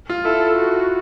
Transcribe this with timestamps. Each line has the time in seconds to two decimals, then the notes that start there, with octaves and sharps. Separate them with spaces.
0.09 F4
0.25 E4 A4
0.57 F#4